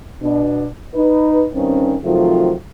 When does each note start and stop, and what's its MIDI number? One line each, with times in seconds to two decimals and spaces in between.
0.22 0.67 47
0.22 0.67 62
0.94 1.45 63
0.94 1.45 71
1.53 1.95 43
1.53 1.95 51
1.53 1.95 60
1.53 1.95 61
2.03 2.52 48
2.03 2.52 51
2.03 2.52 53
2.03 2.52 54
2.03 2.52 57
2.03 2.52 65